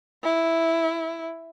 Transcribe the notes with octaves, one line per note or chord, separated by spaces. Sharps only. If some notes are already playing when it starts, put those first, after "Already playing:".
E4